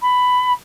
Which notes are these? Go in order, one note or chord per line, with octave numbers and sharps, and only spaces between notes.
B5